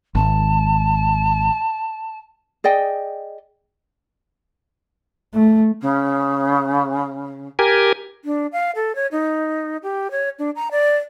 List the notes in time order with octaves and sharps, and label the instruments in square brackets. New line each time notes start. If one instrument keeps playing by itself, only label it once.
[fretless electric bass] G#1 [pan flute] A5
[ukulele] G#4 D5 D#5 G5
[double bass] A3
[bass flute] C#3
[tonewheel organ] G4 A#4 G#5
[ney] D4
F5
A4
C#5
D#4
G4
C#5
D4
A#5
D5